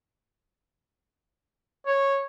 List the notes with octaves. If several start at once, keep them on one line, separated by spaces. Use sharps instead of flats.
C#5